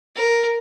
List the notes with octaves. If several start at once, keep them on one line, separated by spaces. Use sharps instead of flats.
A#4